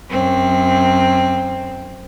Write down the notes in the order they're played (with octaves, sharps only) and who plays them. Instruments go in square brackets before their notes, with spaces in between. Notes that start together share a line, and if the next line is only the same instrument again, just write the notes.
[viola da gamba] F#2 C4